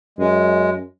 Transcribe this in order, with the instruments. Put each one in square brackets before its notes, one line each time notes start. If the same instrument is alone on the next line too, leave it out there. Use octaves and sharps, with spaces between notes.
[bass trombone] F#2 [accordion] G#3